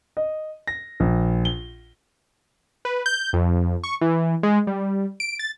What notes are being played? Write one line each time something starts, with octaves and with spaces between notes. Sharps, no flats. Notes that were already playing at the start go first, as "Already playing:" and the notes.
D#5
A#6
A#1
G7
B4
G6
F2
C#6
E3
G#3
G3
D7
A6